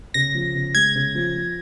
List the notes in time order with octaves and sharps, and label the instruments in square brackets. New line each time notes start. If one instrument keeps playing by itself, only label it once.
[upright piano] C#3 [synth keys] A#6
[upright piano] F3
C#3
[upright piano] G#3 [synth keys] G#6
[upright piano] C#3
F3
F3